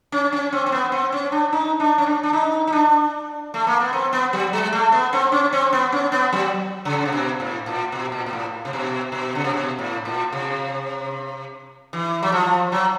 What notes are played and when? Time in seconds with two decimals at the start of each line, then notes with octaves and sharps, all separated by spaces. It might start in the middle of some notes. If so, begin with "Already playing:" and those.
0.12 C#4
0.33 C#4
0.52 C4
0.66 C4
0.72 B3
0.92 C4
1.12 C#4
1.32 D4
1.52 D#4
1.80 D4
1.98 C#4
2.06 D4
2.23 D4
2.33 D#4
2.67 D#4
2.72 D4
3.54 A3
3.67 A#3
3.80 B3
3.93 C4
4.13 B3
4.33 F#3
4.53 G#3
4.73 A3
4.92 B3
5.13 C4
5.32 C#4
5.53 C4
5.73 B3
5.92 C#4
6.12 B3
6.33 F#3
6.85 C#3
7.05 C3
7.12 B2
7.40 A2
7.66 A#2
7.92 B2
8.12 A#2
8.26 A#2
8.33 A2
8.65 C3
8.73 B2
9.12 B2
9.35 C#3
9.44 C3
9.53 B2
9.79 A2
10.05 A#2
10.32 C3
11.93 E3
12.23 F#3
12.32 F3
12.72 F#3